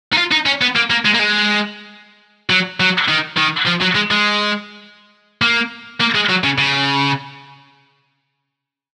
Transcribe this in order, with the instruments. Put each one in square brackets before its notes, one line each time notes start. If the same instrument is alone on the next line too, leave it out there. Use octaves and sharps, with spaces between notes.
[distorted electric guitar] D#4
F4
D#4
C#4
B3
A#3
A#3
G#3
A#3
G#3
F#3
F#3
D#3
D#3
F3
F#3
G#3
G#3
A#3
A#3
G#3
F#3
C#3
C#3